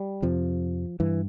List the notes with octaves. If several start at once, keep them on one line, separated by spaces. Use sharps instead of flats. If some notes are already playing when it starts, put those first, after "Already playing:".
Already playing: G3
F2 C3 F3
G2 E3